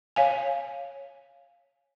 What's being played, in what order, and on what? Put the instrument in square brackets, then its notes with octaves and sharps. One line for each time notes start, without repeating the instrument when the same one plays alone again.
[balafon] C#5 F5 G#5